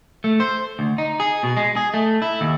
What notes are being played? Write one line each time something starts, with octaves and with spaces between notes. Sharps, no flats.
A3
C5
D2
D#4
G#4
B2
G#3
G#4
A3
E4
D#2